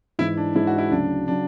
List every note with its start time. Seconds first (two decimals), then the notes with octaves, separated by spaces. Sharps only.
0.19 G#2 E3 G#3 E4
0.37 D4
0.55 G#2 E3 G#3 E4
0.67 F#4
0.78 E4
0.91 D2 C#3 F#3 D4
1.28 C#3 F#3 D4